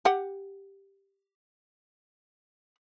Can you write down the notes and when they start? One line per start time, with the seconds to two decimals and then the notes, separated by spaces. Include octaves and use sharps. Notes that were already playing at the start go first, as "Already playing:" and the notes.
0.05 G4 F#5